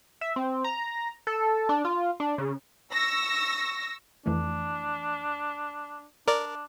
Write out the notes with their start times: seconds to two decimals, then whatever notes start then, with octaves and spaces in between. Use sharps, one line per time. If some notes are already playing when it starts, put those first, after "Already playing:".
0.21 E5
0.36 C4
0.64 A#5
1.27 A4
1.69 D4
1.85 F4
2.20 D4
2.38 C#3
2.93 C#6 E6 A#6
4.26 F2 E3 A3 D4
6.28 D4 A#4 D5